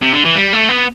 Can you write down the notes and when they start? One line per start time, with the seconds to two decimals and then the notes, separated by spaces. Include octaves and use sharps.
0.02 C3
0.13 D3
0.25 E3
0.35 G3
0.53 A3
0.69 B3